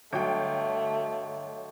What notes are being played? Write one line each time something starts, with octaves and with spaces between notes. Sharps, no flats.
G1 F#3 A3 C#5 D#5 F#5 G5